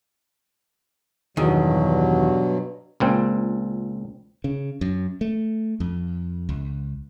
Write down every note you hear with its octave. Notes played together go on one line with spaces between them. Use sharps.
E2 G2 B2 D#3 F#3
C#2 A#2 C4
C#3
F#2
A3
F2
C#2